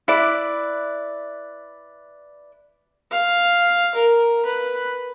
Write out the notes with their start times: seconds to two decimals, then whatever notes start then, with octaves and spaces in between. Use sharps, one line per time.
0.08 E4 B4 D5
3.11 F5
3.95 A#4
4.45 B4